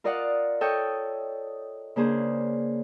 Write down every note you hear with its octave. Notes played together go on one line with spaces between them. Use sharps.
F4 A#4 D5 D#5 F5 F#5
A4 C#5 D#5 G5
C#3 A#3 D4 G#4 C5